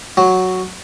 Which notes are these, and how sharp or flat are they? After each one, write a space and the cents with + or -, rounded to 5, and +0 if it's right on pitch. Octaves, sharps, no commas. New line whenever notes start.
F#3 +0